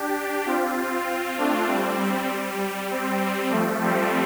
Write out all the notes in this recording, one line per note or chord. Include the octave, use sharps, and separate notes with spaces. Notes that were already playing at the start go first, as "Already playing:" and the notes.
Already playing: D4 G4
C4 F4
A3 D4
G3 C4
G3
G3
G3 C4
G3 C4
F3 A3
G3 C4